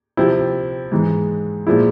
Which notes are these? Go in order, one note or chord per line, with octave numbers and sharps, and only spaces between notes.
C3 F3 C4 E4
G#2 E3 G#3
A#2 F3 G#3 E4